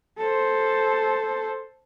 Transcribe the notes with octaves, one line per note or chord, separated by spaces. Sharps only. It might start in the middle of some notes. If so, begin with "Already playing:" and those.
A4 C5